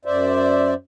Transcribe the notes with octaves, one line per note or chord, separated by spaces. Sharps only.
F#2 C5 D5 E5